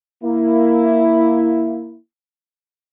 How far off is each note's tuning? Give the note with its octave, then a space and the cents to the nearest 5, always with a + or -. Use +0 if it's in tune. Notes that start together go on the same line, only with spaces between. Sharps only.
A#3 +0 E4 +0